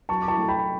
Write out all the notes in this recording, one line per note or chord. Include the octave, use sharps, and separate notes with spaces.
F#3 A5 C#6
D6
A5 C#6
A3
G5 B5